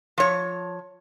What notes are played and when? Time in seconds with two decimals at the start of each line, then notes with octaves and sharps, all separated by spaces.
0.18 F3 C#5